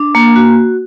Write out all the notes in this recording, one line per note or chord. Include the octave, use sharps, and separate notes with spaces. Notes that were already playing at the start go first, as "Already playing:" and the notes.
Already playing: D4
A#3
F#4